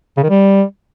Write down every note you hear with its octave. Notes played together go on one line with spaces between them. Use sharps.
C#3
D#3
G3